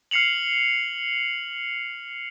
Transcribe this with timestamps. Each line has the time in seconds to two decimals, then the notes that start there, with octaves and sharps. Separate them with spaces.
0.11 F6 C7 C#7 F7 F#7